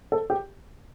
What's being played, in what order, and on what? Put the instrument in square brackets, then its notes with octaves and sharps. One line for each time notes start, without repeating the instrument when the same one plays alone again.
[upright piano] A4
G4